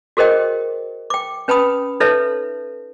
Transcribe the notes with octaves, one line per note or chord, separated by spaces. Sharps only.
F#4 G#4 A#4 C5 D#5 G5
G5 D6
C#4 B4 G5 A5 B5 D#6
D#4 A4 B4 C#5 E5 A5